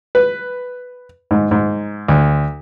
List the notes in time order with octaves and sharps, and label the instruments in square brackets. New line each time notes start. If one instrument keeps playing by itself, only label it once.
[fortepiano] B4
G#2
G#2
D2